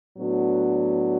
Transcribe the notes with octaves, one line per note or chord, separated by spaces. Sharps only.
A2 F#3 B3 D4 F#4